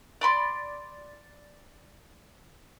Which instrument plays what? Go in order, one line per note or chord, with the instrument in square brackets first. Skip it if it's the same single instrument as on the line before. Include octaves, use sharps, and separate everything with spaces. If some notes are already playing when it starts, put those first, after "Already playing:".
[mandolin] D5 B5 C6